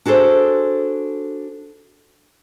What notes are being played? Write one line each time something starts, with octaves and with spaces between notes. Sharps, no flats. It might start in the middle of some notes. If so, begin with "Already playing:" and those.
D4 F#4 G#4 A4 C5